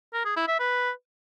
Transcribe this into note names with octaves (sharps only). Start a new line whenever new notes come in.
A#4
G#4
E4
E5
B4